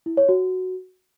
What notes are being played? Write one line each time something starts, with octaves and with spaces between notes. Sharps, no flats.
E4
C#5
F#4